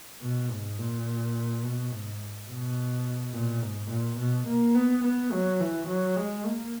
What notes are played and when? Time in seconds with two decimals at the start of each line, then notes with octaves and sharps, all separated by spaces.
0.22 B2
0.51 G#2
0.78 A#2
1.63 B2
1.91 G#2
2.49 B2
3.33 A#2
3.62 G#2
3.90 A#2
4.18 B2
4.47 A#3
4.75 B3
5.04 B3
5.32 F#3
5.60 E3
5.88 F#3
6.16 G#3
6.45 A#3